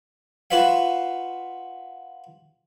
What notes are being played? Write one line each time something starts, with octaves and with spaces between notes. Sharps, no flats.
F4 F#4 B4 C5 E5 F5